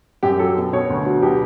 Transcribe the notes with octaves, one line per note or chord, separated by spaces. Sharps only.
F#2 G4
F#3 A4
B2
B2 C#5
D2
F#3
B2 G4